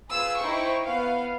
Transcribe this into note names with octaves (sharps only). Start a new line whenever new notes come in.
F4 G#4 B4 E6
D#4 E4 C5 G5 C#6
B3 F5